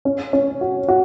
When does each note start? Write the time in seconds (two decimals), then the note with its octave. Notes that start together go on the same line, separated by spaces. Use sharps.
0.05 C#4
0.33 C#4
0.61 F#4
0.88 F#4